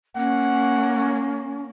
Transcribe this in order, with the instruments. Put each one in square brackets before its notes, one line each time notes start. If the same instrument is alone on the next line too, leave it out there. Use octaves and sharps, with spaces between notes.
[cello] A#3 [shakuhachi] C#4 [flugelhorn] F#5